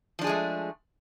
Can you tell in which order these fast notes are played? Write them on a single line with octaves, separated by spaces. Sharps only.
F3 D4 G#4 G#3 A3